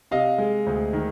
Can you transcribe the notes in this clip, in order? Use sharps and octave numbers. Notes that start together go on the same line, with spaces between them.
C3 D#5 F5
G#3
D2
D#3